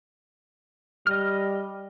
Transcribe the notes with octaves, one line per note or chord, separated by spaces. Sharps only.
G3 D#5 F6